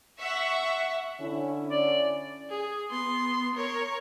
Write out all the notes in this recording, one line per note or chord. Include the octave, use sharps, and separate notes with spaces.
E5 F#5 C#6
D3 C#4 E4
D5
G#4
B3 C6
A#4 C#5